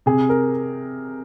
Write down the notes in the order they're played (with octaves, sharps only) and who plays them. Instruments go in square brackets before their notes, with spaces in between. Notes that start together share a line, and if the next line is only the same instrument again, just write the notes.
[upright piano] C3 G#4
A#4